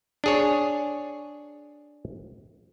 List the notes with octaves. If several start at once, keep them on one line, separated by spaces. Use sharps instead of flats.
D4 G#4 C#5